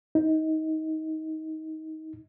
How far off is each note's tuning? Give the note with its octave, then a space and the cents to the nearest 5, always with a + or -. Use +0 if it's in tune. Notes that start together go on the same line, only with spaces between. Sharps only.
D#4 +20